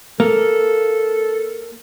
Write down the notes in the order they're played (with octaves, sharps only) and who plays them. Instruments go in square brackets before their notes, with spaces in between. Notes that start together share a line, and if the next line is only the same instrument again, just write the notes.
[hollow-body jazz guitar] A#3 [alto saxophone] A4